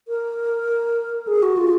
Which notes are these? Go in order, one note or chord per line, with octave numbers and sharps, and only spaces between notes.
A#4
G#4
F#4
F4